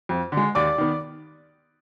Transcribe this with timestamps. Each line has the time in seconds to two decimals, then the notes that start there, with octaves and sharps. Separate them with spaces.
0.09 F2
0.32 D3
0.37 G#3
0.55 D#2 D5 D6
0.78 D#3 B3